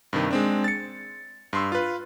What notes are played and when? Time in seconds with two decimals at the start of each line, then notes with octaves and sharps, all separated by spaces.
0.13 G2 C3 D#3
0.31 G#3 C4 D4
0.64 A6 C#7
1.53 G2 C6 E6
1.72 F4 B4